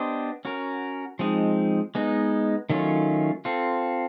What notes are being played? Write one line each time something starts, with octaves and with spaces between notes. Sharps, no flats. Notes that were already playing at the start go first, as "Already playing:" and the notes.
Already playing: B3 D4 G4 C5 D#5
C#4 F#4 A#4
F3 G#3 C4 D#4
G#3 B3 D#4
D#3 F#3 A3 C#4 F4
C4 F4 A4